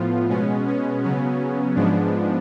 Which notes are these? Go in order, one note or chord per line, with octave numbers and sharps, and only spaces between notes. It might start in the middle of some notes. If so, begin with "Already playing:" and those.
Already playing: A2 F3 B3 F4
B2 G#3 B3 C#4
C#4
C#3 F#3 B3
G#2 F3 G#3 B3 D4